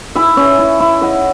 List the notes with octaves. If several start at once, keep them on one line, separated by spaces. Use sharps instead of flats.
E4 E5 G#5
C#4
E4
E4
E4 D#5 F#5